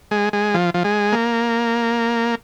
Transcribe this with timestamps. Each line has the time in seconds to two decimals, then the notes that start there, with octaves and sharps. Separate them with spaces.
0.11 G#3
0.33 G#3
0.54 F3
0.74 F3
0.84 G#3
1.12 A#3